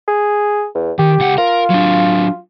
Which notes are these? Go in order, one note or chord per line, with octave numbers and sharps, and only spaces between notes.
G#4
E2
D#3 G4
C#2 F#5
F4 A#4
F#3 D4